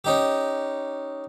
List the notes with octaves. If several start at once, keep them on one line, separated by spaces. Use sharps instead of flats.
C#4 D#4 G4